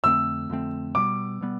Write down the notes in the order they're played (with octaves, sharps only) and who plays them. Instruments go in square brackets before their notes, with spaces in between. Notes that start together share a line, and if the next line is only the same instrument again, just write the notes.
[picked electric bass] F2 D3 A3 C4 [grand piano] E6
[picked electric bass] F2 D3 A3 C4
[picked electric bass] B2 G3 B3 [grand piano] D6
[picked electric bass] B2 G3 B3